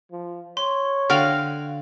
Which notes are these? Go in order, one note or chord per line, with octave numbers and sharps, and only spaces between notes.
F3
C#5 C6
D3 F#4 F5 G5 F6 F7